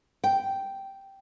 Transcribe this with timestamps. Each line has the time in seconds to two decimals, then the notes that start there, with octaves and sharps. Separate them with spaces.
0.24 G5